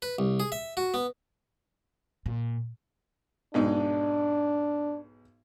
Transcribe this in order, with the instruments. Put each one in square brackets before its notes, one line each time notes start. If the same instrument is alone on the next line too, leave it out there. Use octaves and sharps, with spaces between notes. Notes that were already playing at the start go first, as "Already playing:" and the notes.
[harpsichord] B4
C2
G#4
E5
F#4
B3
[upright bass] A#2
[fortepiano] B1 G#2 D#4 [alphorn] D4